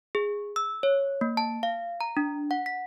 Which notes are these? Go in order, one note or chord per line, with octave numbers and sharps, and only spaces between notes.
G#4
E6
C#5
A#3
A5
F5
A#5
D4
F#5
B6